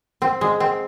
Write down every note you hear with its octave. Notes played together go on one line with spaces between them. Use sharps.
C4
G#3
C4